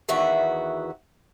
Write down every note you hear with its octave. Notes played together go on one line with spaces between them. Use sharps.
E2 D#3 E3 F#4 E5 F#5